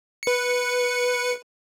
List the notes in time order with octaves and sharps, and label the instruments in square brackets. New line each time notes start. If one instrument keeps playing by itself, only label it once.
[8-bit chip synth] B4 C#7